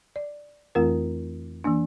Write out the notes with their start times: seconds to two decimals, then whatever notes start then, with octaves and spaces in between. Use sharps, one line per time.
0.16 D5
0.75 F2 E3 A3 C4 F4 A#4
1.64 E3 A#3 D4